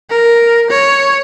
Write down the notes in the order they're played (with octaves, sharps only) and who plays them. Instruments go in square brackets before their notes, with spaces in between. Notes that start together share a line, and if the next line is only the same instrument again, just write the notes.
[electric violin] A#4
C#5